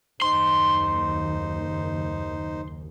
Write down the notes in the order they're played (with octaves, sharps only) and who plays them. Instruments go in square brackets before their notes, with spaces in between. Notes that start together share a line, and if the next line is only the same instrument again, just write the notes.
[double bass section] F#1 D#2 [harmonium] D#4 C5 [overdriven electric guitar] C6